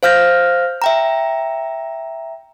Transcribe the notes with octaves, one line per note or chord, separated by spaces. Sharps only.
C5 F5 F6 G6 A#6
E5 G5 A#5